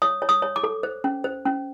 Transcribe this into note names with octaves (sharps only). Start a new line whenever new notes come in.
C#5 D#6
C#5
D#6
C#5
D6
A4
C5
C#4
C5
C#4